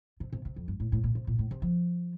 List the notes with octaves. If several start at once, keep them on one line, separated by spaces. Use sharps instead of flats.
C3
C3
C3
F2
G2
A2
A2
A#2
C3
A#2
A2
C3
F3